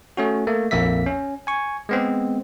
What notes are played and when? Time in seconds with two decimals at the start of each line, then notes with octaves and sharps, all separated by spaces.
0.17 A3 C#4 F#4
0.47 A3 A#3
0.71 A#1 F2 A#3 E5 B6
1.06 C#4
1.47 G#5 C#6
1.89 G#3 B3 C4